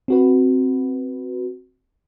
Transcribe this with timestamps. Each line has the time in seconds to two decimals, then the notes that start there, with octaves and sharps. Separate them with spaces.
0.08 C4 F#4 B4